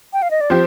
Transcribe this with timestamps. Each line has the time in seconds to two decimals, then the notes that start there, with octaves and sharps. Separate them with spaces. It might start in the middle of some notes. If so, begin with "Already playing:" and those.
0.13 G5
0.22 F5
0.31 D#5
0.41 D5
0.50 F3 C4 G4 C5